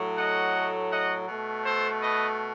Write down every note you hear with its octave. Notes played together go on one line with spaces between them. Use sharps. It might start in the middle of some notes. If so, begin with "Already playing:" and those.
Already playing: A2 F#3 A3
D#5 F#5
D#5 F#5
B2 A3
A4 C5
B4 D#5